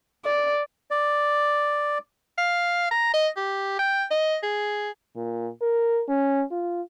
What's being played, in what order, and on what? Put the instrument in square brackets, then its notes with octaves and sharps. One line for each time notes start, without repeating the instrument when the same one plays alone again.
[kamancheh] D5
[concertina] D5
[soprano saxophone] F5
A#5
D#5
G4
G5
D#5
G#4
[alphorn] A#2
A#4
C#4
F4